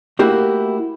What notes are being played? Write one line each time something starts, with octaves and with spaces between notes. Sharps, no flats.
A3 A#3 E4 F#4 G4